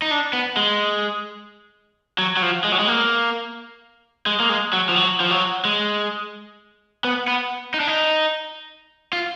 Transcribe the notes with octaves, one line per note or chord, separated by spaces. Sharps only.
D#4
D4
B3
G#3
F#3
F#3
F3
G#3
F#3
G#3
A#3
G#3
A#3
G#3
F#3
F3
F#3
F3
F#3
G#3
B3
B3
D#4
D4
D#4
F4